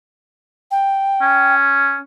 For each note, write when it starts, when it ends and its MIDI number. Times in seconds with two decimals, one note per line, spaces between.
0.71 1.54 79
1.21 1.98 61